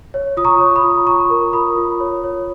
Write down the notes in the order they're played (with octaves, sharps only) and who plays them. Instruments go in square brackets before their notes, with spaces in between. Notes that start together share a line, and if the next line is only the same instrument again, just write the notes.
[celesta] C#5
F4 D#6
A#5 C#6
C#5
B5 D#6
F4
F4 A#5 C#6
A#4
F4 B5 D#6
F4
C#5
C#5